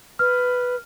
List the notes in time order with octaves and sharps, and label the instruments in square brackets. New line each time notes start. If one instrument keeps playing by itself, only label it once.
[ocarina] B4 [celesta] F6